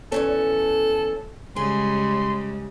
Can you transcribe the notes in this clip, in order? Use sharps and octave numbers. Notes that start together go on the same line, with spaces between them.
E2 G2 C#4 A4
C#3 G3 G#3 G#4 C6